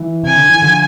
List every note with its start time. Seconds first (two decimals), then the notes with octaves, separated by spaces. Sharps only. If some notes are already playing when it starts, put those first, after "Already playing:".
Already playing: E3
0.23 C3 G#5
0.36 D3
0.50 E3
0.62 D3 F3